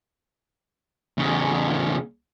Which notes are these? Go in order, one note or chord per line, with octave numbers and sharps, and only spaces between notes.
E2 C#3